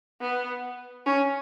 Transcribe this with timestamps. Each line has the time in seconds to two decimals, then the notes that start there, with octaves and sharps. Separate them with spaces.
0.21 B3
1.06 C#4